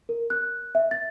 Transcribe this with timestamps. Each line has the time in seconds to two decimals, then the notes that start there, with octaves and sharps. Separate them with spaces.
0.09 A#4
0.30 F#6
0.75 E5
0.91 A6